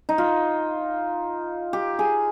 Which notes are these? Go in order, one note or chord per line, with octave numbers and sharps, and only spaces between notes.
D#4
F4
G4
G#4